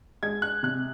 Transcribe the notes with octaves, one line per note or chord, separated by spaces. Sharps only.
G#3 G#6
F#6
C3 F#6